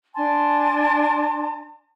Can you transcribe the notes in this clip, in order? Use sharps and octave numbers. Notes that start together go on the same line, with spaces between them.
D4 G#5 A5 C6